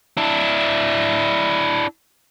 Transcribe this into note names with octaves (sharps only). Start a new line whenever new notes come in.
D4 E4